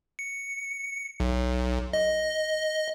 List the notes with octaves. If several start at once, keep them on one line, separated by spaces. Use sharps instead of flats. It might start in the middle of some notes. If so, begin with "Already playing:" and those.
C#7
B1
D#5